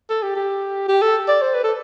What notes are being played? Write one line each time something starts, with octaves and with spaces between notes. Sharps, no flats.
A4
G4
G4
G4
A4
D5
C5
B4
A4